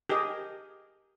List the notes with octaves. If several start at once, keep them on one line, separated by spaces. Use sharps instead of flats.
G4 G#4 A#4 D#5